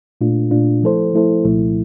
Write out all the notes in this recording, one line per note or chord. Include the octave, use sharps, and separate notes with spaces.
A#2 A3 D4 F4
A#2 A3 D4 F4
F3 A3 E4 A4 C5
F3 A3 E4 A4 C5
C2 A#2 F3 A3 E4